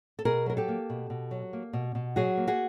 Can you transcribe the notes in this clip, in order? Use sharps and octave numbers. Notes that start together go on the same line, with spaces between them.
A4
B2 G#4 A#4
F#3 A#4
G4 A4
A#3
B2
B2
F#3
A#3
B2
B2
F#3 F#4 G#4
A#3
F#4 G#4